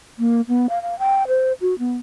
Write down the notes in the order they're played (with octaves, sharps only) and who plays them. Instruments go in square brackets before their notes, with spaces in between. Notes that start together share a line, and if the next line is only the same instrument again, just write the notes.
[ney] A#3
B3
F5
F5
G5
C5
F#4
B3